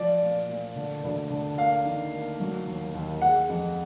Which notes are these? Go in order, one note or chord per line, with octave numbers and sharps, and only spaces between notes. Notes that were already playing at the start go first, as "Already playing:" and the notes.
Already playing: F3 D5
A#2
A#2
D3
D2
D3
A#3 F5
D#3
A#3
F#3
D#2
D#2
G#3 F#5
F2